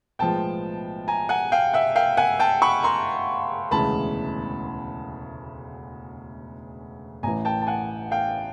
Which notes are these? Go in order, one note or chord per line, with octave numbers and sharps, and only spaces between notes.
B1 A2 F3 G#3 B3 G5 A5
G#5 A#5
F#5 G#5
F5 G5
E5 F#5
F5 G5
F#5 G#5
G5 A5
B5 C#6
A#5 C6
E1 D2 C#3 E3 G#3 A5 B5
A1 A2 E3 G#5 A#5
G5 A5
A5
F#5 G#5
F5 G5